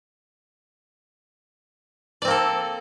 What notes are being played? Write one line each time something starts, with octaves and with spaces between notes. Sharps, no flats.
A#3 C4 A4 D5